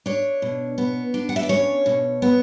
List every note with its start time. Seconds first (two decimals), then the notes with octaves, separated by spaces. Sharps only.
0.06 D4 C#5
0.42 B2
0.78 B3
1.14 D4
1.29 F#5
1.36 E5
1.43 D5
1.49 C#4 C#5
1.86 B2
2.22 B3